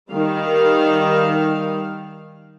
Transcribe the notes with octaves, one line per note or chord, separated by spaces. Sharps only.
D#3 G3 F5